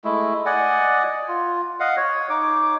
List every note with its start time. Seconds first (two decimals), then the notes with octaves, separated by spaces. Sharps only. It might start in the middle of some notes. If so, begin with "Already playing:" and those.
0.04 G#3 A3 E4
0.46 D5 D#5 F#5 G#5
1.28 F4
1.80 D#5 F5 F#5
1.97 C#5
2.30 D#4 D6